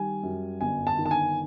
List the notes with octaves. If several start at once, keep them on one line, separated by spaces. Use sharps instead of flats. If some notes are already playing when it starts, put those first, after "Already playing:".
Already playing: D#3 G3 G#5
F#2
G1 G#5
A5
D#3
A5
G#5